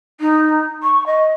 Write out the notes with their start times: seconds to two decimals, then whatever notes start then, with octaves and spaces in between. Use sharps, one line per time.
0.20 D#4
0.83 C#6
1.06 D#5